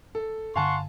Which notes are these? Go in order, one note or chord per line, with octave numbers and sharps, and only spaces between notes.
A4
G2 D3 F5 F#5 G#5 A5 C6 C#6